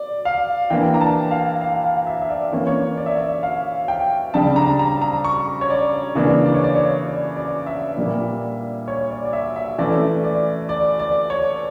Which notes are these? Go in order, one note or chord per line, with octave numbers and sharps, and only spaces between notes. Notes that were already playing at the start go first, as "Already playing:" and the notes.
Already playing: D5
F5
E3 A#3 D4 G5
A#5
A5
F5
F5
F5
E5
E5
D5
E3 A#3 C#4 C#5
D5
C#5
D5
E5
D5
F5
G5
C#3 G3 D4 A5
A#5
A#5
A#5
C#6
C#5
D5
C#3 E3 A#3 D4 D5
D5
C#5
D5
C#5
D5
D5
E5
A#2 G3 A#3
C#5
D5
D5
E5
E5
E3 A3 C#4 D5
D5
D5
D5
C#5